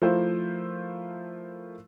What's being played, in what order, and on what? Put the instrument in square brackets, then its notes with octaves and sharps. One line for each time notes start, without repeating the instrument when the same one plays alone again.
[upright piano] F3 A3 E4 F4 A#4 C5